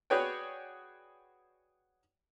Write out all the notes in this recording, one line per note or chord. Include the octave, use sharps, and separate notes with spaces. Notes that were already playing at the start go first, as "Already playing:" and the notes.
F#4 G#4 B4 C#5 D5 G5